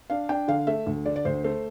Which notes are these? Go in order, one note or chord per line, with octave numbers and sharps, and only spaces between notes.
D4 F5
D4 G5
D3 F5
A3 E5
D2
D3 D5
D5
D2 C5
A3 C5